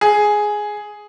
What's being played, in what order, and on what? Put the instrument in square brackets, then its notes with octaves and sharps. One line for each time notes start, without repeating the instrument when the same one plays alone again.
[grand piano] G#4